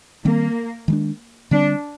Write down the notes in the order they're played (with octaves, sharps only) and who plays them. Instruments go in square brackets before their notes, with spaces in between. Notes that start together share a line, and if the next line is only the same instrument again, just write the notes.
[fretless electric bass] D#3 G3 C4 [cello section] A#3
[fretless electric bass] D#3 G#3 D4
[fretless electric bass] D3 G3 C4 [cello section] D4